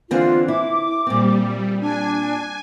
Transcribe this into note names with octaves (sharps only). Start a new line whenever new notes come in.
D3 E3 C4 F4
E4 D6
A#2 G3 C4
D4 G#5